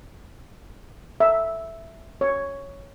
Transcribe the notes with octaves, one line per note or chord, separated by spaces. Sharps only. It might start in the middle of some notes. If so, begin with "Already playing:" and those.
E5
C#5